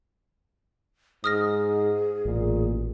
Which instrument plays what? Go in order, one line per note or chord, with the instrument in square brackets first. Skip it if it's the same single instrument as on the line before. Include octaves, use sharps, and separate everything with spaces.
[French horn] G#2 [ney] G#4 [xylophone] D#6 F6 A#6
[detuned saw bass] A1 [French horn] A#2